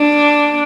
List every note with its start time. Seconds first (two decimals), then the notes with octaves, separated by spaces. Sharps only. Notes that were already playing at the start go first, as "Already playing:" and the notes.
Already playing: D4